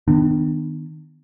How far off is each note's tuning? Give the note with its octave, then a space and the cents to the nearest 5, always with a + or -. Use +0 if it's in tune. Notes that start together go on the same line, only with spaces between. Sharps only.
D#3 +5 B3 +0 D4 +40